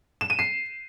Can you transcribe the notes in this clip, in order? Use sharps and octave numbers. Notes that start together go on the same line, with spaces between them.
E7
D#7
C7